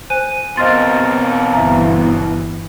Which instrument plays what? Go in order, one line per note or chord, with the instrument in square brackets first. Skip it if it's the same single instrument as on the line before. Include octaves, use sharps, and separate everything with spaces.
[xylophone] C5 G#5 F#6 [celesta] D#7
[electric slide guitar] B2 A#3 C4 [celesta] C5 F6 A6 [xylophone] D#5 C6
[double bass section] G1 E3 [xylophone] E5 A#5